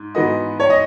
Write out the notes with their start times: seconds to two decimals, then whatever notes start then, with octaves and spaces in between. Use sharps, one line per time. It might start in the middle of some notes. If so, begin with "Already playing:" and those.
Already playing: G#2
0.15 G#2 E3 B3 F#4 B4 D#5
0.60 C#5
0.70 D#5